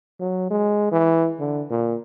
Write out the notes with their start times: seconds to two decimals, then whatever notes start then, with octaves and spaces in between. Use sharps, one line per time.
0.20 F#3
0.51 G#3
0.92 E3
1.40 D3
1.71 A#2